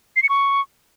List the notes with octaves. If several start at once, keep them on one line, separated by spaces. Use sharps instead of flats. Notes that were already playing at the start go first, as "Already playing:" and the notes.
C7
C#7
C#6